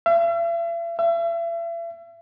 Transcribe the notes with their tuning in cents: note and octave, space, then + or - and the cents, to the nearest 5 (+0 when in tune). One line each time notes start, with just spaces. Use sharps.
E5 +45
E5 +40